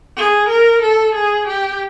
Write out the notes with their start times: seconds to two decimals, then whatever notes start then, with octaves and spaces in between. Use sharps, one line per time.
0.17 G#4
0.49 A#4
0.82 A4
1.15 G#4
1.47 G4